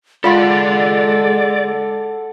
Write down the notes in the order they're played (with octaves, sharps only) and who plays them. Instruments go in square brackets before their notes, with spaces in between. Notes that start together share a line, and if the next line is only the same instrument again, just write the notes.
[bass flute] G#3 [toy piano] F4 F5 C6 [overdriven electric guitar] A4 F#5 [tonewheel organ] D5